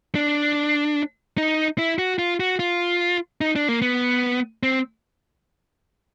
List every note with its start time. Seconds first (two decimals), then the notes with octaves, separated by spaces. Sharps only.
0.15 D4
1.38 D#4
1.78 E4
1.99 F#4
2.19 F4
2.40 F#4
2.59 F4
3.41 D#4
3.56 D4
3.69 A#3
3.82 B3
4.63 C4